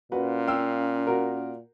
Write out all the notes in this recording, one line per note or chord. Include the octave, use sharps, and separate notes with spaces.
A#2 C#4 F#4 B4
F5 G5 E6
F#4 A#4